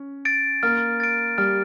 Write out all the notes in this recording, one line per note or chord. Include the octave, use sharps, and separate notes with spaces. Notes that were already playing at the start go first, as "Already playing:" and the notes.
Already playing: C#4
A6 D7
A#3 F6
A6 D7
G3 F6